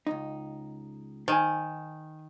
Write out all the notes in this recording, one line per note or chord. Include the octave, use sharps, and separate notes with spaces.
C#2 D#4
D#3 C5 G#5